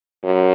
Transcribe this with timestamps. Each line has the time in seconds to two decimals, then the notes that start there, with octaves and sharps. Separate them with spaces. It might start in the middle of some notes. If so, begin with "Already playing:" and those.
0.24 F#2